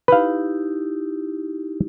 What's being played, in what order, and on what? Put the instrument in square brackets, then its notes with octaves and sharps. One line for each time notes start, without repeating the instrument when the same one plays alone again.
[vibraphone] D#4 E4 G4 [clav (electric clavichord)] B4 F5